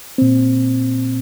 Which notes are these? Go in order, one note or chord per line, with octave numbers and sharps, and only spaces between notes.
A#2 C4